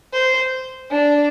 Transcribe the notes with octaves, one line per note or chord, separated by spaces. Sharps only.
C5
D4